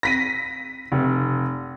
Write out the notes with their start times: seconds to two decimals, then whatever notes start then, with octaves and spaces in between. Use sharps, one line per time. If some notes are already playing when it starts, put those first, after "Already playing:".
0.03 A#6 B6 D#7
0.92 F1